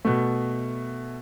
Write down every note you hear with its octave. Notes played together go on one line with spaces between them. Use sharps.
B2 A3